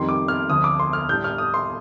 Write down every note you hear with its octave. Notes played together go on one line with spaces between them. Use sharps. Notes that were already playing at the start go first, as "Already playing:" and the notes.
Already playing: F2 D#3 G3 C6
D6
F6
D2 D3 F3 D#6
D6
C6
F6
A2 G3 D4 G6
F6
D#6
C6